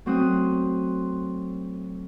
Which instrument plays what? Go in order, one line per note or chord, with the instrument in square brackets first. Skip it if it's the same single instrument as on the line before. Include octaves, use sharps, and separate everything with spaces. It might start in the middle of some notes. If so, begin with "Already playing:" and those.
[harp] F#3 A3 C4 C5 D#6 F#6